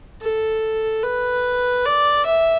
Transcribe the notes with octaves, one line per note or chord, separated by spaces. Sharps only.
A4
B4
D5
E5